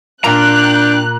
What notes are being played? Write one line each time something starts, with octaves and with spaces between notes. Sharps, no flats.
A#2 D4 F5 G5 A#5 F#6